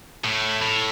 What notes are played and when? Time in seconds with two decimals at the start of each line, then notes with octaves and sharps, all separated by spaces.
0.24 A2
0.62 A2